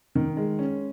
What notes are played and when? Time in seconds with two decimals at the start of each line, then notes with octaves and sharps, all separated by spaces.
0.15 D#3
0.37 G#3
0.59 C#4